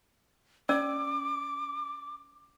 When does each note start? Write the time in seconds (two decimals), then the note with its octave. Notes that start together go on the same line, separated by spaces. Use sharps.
0.69 C#4 D5 D6 E6